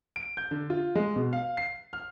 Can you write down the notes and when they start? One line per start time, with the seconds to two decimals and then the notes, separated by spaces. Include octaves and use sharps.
0.16 D7
0.37 G6
0.51 D3
0.70 F4
0.95 G#3
1.16 B2
1.33 F5
1.57 C7
1.93 F6